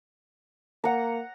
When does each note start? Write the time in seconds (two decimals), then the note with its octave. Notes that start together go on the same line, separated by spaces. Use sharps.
0.84 A#3 F#5 A#5